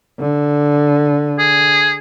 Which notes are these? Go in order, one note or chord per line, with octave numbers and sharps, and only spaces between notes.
D3
G#4